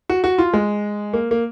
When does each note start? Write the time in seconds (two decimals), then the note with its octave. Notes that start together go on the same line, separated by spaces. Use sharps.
0.09 F#4
0.24 F#4
0.38 F4
0.53 G#3
1.13 A#3
1.31 A#3